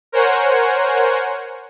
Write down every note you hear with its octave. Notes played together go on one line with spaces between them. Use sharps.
A#4 C5 C#5 F#5 G#5